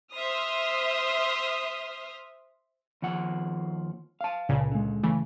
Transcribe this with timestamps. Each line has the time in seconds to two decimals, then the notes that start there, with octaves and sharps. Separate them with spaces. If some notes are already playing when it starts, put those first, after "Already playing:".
0.13 C5 E5 C6 D#6 F6
3.02 D#2 F3 F#5
4.21 F5 A5
4.49 C#2 A#2 C#3
4.71 D3 G#3
5.03 C#3 E3 A3